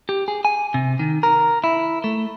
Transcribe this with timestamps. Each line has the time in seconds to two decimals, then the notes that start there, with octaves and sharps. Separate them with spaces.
0.09 G4
0.28 G#4
0.45 G#5
0.74 C3
0.99 D#3
1.23 A#4
1.64 E4
2.04 A3